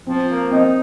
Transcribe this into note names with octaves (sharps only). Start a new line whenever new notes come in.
F3 C4
A#3
C4 D#4